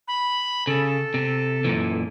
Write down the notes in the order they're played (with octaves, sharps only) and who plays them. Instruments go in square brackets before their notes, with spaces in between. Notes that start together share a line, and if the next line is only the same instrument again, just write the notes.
[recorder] B5
[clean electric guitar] C#3 [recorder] A4
[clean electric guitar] C3
F#2 A#2 E3